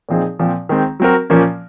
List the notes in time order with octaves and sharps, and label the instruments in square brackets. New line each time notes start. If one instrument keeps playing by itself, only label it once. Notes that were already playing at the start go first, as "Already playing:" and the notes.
[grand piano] A#2 F3 C4 D#4 G#4
A#2 F3 C4
D#3 G#3 C4
F#3 C4 F#4 A#4
A#2 F3 A#3 C#4